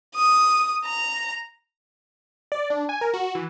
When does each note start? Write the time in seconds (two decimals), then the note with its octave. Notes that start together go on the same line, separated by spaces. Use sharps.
0.15 D#6
0.85 A#5
2.52 D5
2.70 D4
2.89 G#5
3.01 A#4
3.14 F#4
3.35 E3